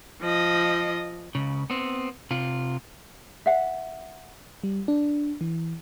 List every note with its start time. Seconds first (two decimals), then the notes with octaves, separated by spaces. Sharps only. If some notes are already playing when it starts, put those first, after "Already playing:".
0.21 F3 D#5
1.35 C#2 C#3
1.70 B3 C4
2.31 C3 F4
3.46 E5 F#5
4.64 G3
4.88 D4
5.41 E3